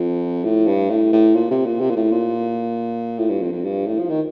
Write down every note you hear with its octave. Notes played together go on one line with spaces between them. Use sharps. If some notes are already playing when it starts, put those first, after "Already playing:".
Already playing: F2
A2
G2
A2
A2
A#2
C3
A#2
C3
A#2
A2
A#2
A2
G2
F2
F2
G2
A2
F3
D#3